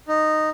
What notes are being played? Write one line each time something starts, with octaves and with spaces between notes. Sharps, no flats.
D#4